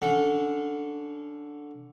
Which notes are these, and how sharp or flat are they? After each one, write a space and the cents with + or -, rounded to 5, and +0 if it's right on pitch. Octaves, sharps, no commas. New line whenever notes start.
D3 +0 C#4 +20 F#5 -15